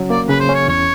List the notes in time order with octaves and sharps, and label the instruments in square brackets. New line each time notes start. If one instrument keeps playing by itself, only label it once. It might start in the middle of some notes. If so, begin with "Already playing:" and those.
Already playing: [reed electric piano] C#3 F#3 C#4
[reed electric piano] A#3 [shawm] D5
[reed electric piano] C#3 [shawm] B4
[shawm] C5
[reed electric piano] C#4
[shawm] C#5
[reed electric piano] E2 [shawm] C#5